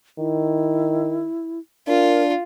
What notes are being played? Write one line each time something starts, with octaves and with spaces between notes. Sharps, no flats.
D#3 E4
D4 F4 A#4